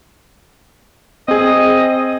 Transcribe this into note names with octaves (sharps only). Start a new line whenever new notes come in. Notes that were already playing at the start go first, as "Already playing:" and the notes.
C4 G#4 D#5